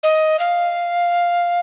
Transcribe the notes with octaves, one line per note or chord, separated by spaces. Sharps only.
D#5
F5